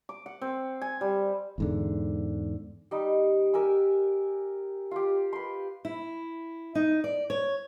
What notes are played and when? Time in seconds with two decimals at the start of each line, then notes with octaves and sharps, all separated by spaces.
0.09 D6
0.26 F#5
0.41 C4
0.82 G#5
1.01 G3
1.58 E2 G#2 D3
2.91 G3 D#4
3.54 G4 A#4 G#5 E6
4.91 F4 G4
5.33 B4 C6
5.85 E4
6.75 D#4
7.04 D5
7.30 C#5